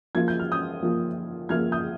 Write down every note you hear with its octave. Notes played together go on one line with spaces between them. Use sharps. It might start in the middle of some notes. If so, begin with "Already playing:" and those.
F3 A#3 F4 G#6
G6
F6
D#6 G6
F3 A#3 F4
F3 A#3 F4 F6 G#6
D#6 G6